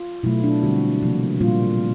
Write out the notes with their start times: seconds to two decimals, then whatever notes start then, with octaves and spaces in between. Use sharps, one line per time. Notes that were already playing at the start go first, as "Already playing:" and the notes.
Already playing: F4
0.23 B2 F#3 A3 E4
0.43 D4
0.63 D3 G3 C4 F#4
1.02 C3 F3 A#3
1.41 A#2 G3 A#3 F4